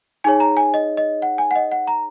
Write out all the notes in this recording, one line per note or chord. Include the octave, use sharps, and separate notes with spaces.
D#4 G#4 C#5 G#5
A#5
G#5
D#5
D#5
F#5
G#5
F#5
D#5
F#5
A#5